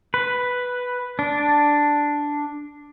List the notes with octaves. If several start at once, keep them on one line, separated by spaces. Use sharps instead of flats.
B4
D4